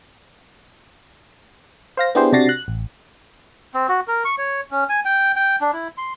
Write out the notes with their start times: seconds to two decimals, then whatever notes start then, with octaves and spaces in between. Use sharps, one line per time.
1.97 C5 F5 A#6
2.15 B3 D4 E4 G4 G#4 C5
2.33 C3 D4 F#4 A6 A#6 C7
2.49 F#6
2.68 A1
3.74 C4
3.89 F#4
4.08 A#4
4.25 C#6
4.38 C#5
4.71 C#4
4.89 G#5
5.05 G5
5.36 G5
5.61 D4
5.73 E4
5.98 C6